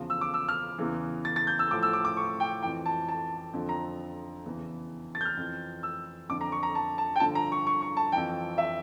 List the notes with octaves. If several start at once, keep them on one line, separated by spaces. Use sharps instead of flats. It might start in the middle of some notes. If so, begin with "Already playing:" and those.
Already playing: E2 C#3 F3
E6
D6
E6
F6
E2 C#3 E3
A6
A6
G6
E6
A2 F3 D6
E6
D6
D6
C#6
G5
F2 E3 G5
A5
A5
F2 D3 F3
A#5
E2 C#3 E3
A6
G6
F6
F2 E3
E6
F2 D3 F3 D6
A#5
C#6
A#5
A5
A5
G5
G2 D3 F3 A5
A#5
C#6
C#6
C#6
A5
F2 E3 G5
E5